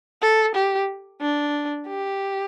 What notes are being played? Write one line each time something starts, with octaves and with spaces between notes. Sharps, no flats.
A4
G4
D4
G4